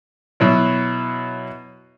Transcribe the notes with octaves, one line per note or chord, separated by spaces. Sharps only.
B2 F#3 E4